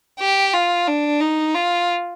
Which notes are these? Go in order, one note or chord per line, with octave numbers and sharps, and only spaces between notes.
G4
F4
D4
D#4
F4